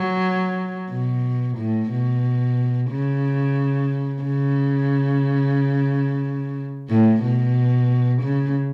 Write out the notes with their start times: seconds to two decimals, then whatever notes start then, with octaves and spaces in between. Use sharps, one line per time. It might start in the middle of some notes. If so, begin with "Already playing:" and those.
Already playing: F#3
0.91 B2
1.57 A2
1.91 B2
2.90 C#3
4.22 C#3
6.90 A2
7.22 B2
8.22 C#3